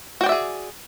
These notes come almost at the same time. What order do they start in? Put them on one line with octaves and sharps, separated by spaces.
F#4 G5 D5 E5 G#4